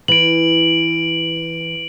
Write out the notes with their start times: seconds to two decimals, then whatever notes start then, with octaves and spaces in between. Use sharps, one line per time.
0.08 E3 D7 F#7